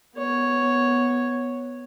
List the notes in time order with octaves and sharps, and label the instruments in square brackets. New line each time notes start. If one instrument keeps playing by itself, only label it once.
[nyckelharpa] B3 C#5